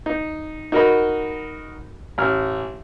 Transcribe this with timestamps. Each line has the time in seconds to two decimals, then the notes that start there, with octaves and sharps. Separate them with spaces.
0.06 D#4
0.72 D#4 F#4 A#4 D#5 B5
2.18 A1 F6